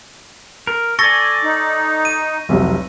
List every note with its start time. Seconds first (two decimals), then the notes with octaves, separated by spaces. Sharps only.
0.67 A#4
0.99 A4 D5 G#5 C#6 A#6
1.43 D#4
2.05 D#7
2.49 F1 C2 F#3